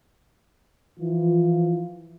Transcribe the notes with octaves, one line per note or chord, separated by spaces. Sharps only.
E3 F3 F4